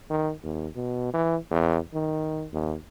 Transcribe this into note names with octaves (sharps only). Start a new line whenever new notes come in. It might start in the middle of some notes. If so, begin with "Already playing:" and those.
D#3
D#2
B2
E3
E2
D#3
D#2